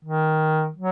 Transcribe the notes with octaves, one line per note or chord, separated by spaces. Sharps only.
D#3
F#3